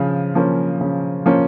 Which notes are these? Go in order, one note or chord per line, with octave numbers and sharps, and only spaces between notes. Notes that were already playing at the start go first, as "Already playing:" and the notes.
Already playing: C#3 F3
F3 A#3 C#4
C#3
F3 A#3 C#4